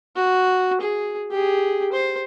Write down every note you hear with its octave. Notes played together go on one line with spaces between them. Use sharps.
F#4
G#4
G4 G#4
C5